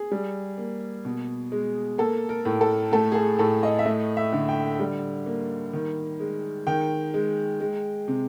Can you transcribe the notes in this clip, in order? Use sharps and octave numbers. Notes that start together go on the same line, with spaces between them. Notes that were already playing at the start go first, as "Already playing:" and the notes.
Already playing: G#4
G3
A#3
B2
G#3
A#3 A4
A#4
A2
A4
A3 A4
G#4
A4
A2 A4
D#5
E5
A3 D#5
E5
D3
G5
G3
A#3
D#3
G#3
D#3 G5
G#3
G#3
C3